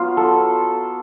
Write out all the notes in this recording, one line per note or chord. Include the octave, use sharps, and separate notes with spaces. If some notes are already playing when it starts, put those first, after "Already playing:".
Already playing: F#3 B3 F4
A4